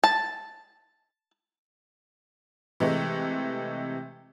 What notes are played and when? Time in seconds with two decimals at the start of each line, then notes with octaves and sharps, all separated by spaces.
0.04 A5
2.80 C3 E3 G#3 A3